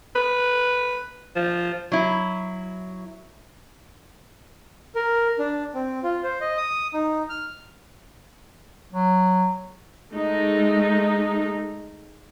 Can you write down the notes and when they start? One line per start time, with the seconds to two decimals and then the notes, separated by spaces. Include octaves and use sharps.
0.16 B4
1.36 F3
1.92 F#3 E4
4.95 A#4
5.39 D4
5.75 C4
6.03 F4
6.24 C5
6.41 D#5
6.57 D#6
6.94 D#4
7.29 F6
8.93 F#3
10.13 G#3 A3 D#4